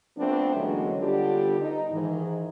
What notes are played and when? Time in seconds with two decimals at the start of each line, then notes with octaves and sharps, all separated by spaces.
0.17 F3 A3 B3 C4 D4
0.55 E2 D3 F#3 G#3 A#3 C#4
0.99 D3 G3 B3 D4 F4 G4
1.60 D#4
1.91 G#2 D#3 E3